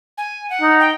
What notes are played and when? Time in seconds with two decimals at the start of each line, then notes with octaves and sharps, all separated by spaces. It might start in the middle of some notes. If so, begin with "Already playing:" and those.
0.18 G#5
0.50 F#5
0.62 D#4
0.80 G5